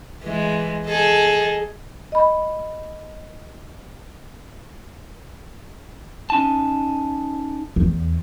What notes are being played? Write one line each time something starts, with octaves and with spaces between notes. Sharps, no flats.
E3 G#3
G#4 A4 D#5
D#5 B5
C#4 D#4 A5
E2